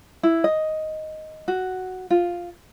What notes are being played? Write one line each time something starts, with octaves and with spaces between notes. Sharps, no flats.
E4
D#5
F#4
F4